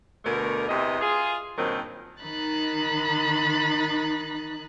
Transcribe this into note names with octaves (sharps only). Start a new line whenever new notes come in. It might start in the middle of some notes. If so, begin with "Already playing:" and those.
D2 B2 D3 A3 A#4
E2 C3 E3 D#5
F4 G#4
G2 A#2 D#3 F#3 C4
D#3 D#4 B5 F#6 A6